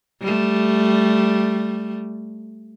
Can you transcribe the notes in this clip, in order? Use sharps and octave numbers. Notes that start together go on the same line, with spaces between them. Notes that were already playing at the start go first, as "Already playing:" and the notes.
G3 A3